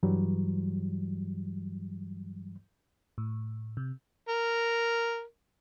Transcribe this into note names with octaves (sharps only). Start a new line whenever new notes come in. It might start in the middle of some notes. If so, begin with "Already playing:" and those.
G2 E3 F#3 G3
A2
C3
A#4